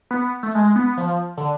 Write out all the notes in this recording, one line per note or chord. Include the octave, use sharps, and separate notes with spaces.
B3
A3
G#3
B3
F3
D3